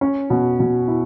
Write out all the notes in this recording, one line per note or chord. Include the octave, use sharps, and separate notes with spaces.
C#4
B2
B2
E4